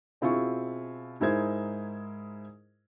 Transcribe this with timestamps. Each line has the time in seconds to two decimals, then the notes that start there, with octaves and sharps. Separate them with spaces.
0.21 B2 C4 E4 F4 G#4 C#6
1.20 G#2 G#3 E4 A#4 C5 G#6